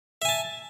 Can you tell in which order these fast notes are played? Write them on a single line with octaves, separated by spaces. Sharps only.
E5 G#5 A5